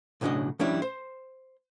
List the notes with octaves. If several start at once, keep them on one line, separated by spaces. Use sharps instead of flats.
B1 A2 C#3 D4 F#4 D#5
F3 G3 C#4 D4 E4
C5